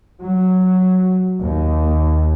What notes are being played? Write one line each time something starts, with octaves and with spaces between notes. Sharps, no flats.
F#3
D#2